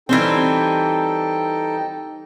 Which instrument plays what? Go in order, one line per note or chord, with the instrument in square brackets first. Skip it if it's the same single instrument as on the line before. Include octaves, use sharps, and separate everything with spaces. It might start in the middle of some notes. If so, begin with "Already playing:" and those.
[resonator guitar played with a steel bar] E3 G3 C4 [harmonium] D#4 A4 G5